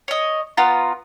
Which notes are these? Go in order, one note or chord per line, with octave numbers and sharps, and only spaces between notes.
C#5 D#5
B3 F4 A#5